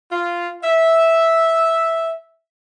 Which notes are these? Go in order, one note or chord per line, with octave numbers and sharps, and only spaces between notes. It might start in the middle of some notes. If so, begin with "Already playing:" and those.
F4
E5